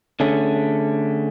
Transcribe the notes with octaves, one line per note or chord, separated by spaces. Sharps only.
D3 A3 C#4 G#4